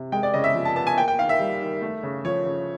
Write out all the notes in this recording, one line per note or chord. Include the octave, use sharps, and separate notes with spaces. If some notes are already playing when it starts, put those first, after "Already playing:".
Already playing: C3
G#3 G5
D5
C#3 D#5
E5
F3
A5
B3 A5
G#5
A#3 G5
G5
D#3 F5
E5
G3
D#3
A3
C#3
F3 C#5
C#3